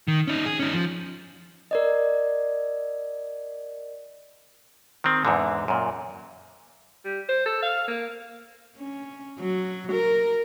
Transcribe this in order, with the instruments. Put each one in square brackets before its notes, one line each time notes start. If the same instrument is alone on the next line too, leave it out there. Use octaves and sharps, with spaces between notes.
[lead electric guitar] D#3
C#4 D#4
G#4
C#4 D#4
F3
[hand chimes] A#4 D5 D#5
[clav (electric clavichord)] D#3 C4
E2 G#2 D3
F#2 A#2
[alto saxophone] G3
C5
A4
F5
A#3
[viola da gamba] C#4
F#3
A#4